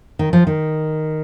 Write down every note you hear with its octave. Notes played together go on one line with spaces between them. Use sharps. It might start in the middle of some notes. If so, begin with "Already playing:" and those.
D#3
F3
D#3